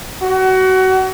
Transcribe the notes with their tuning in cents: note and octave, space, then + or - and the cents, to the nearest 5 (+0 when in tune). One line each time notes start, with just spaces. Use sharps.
F#4 +25